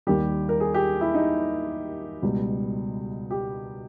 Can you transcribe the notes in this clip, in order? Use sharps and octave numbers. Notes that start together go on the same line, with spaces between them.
D#2 D#3 G3 G4
A#4
G#4
G4
E4
D#4
C#2 B2 G3
G4